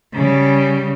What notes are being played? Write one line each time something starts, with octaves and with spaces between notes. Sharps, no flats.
C#3 G3